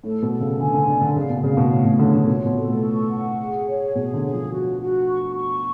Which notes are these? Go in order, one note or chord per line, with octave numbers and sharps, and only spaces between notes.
A2 A4
B2
A4
C#3
D3 G#5
D3
D3 D5
D3
C#3 F5
B2
C#3 F5
B2
A2 C#5
B2
D3 C#5
D3
B2 F4
B2
A4
A2
C#6
F#5
G#4
C#5
B2 G#4
D3
G#4
F3
F#4
F#4
C#6
C#6